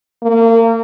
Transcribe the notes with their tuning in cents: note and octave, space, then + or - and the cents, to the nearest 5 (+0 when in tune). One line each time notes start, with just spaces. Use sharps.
A#3 -30